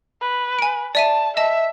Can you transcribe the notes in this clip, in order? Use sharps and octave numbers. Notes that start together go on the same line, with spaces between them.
B4
G#5 D7
D5 E5 A5 D#7
D#5 E5 A5